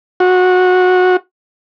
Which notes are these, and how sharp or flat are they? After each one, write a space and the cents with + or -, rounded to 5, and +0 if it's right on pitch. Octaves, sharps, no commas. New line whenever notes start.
F#4 -20